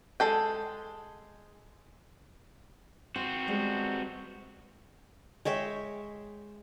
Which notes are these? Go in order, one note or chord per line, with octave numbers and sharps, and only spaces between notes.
G#3 G#4 A4 G5
C4 F#4 C5
G3 G#3 B3
G#3 C#5 E5 G5